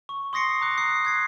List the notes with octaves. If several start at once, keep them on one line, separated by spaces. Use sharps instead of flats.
C#6
C6 D#6 A#6 C7 C#7
A#5 D6 F#6
D#6 F#6 C7
F#6 G#6 C7